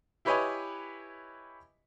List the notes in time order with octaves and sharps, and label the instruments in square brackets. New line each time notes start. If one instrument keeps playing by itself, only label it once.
[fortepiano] E4 G4 B4 C#5 D#5 G#5